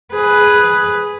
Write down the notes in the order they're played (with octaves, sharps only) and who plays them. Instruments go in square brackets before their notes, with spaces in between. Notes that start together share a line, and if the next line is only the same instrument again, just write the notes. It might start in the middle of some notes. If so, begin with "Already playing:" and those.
[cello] G#4 B4